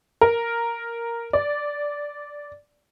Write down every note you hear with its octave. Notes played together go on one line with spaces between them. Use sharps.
A#4
D5